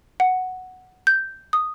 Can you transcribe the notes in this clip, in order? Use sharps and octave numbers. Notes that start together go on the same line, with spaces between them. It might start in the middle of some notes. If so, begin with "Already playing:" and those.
F#5
G6
D#6